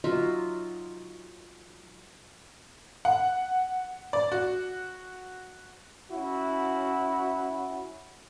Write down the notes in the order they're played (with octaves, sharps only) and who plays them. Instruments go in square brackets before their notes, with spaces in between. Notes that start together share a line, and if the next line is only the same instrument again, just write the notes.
[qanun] F#3 D#4 F4 E5
[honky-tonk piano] F#5
D5
F#4
[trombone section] C#4 E4 F#4